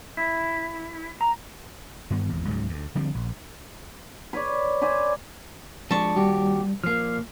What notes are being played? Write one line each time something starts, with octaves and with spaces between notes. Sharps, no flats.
E4
A#5
G2 D#3 B3
G#1 E2
C#2 G#2 C#3 F#3
D2
D3 F3 G3 C4
A#1
B4 C#5 D5
B4 C5 D5 G#5
F3 G#3 D4 A5 C#6
D#2 G3 F#4 G4
F3 A#3 F6 C7